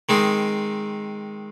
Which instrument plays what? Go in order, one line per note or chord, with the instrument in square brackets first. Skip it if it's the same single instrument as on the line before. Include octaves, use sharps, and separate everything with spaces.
[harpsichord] D#3 G#3 C4 D#4